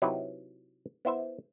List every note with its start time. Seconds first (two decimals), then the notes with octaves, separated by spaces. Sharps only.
0.02 C3 F#3 D#4 E4 G4 B4
1.05 B3 E4 C5 E5